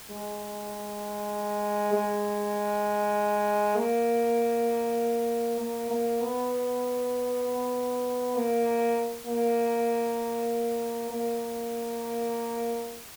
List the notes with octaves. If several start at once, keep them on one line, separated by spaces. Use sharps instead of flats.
G#3
G#3
A#3
A#3
A#3
B3
A#3
A#3
A#3